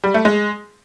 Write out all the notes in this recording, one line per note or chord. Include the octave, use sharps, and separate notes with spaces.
G3
A3
G#3